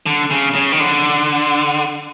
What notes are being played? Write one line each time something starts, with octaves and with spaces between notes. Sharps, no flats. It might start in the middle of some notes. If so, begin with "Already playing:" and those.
D3
C#3
C#3
D#3
D3